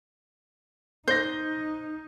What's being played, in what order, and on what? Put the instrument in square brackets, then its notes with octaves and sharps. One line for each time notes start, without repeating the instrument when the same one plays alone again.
[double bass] D#4 [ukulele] C5 [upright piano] G6 A#6